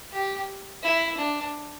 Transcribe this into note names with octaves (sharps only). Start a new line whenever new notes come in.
G4
E4
D4